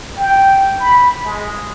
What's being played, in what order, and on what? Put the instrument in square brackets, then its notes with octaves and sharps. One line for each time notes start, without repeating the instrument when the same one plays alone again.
[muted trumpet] G5
B5
G#3